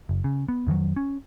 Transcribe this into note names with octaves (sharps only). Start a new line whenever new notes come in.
F#1
C#3
B3
F2 D#3 E3 F#3
C#4